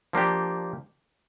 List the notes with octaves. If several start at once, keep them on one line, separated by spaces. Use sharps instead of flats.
F3 A#3 D4 G4